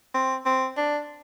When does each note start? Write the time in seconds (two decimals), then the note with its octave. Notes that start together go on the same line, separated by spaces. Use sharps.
0.14 C4
0.45 C4
0.77 D4